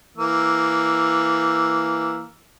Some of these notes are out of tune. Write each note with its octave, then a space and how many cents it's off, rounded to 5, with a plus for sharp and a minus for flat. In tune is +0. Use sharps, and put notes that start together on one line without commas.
E3 +5 A#3 +0 E6 +0